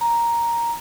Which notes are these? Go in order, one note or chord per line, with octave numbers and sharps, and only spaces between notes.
A#5